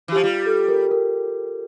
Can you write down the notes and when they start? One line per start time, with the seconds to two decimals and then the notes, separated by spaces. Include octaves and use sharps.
0.08 E3
0.12 F3 G4
0.24 G3 F4
0.46 A4
0.68 A#4
0.91 A#4